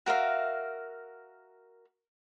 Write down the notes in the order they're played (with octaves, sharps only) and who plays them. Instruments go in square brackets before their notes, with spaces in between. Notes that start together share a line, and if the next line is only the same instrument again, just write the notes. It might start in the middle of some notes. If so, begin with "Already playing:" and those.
[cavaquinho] F#4 A#4 E5 F5